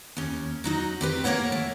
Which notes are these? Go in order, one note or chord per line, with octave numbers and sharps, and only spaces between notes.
D#2 C#4
F#3 D#4 F#4
C4 G4 B4
F2 A#3 A#4 C#5 F#5
A3